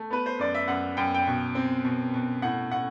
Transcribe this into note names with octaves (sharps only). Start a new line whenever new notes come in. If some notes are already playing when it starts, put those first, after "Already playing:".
Already playing: A3
B3 B4
C5
F#2 D5
E5
F#2 F#5
F#2 G5
G5
B2
C4
B2
B2
A2 F#5
A2 F#5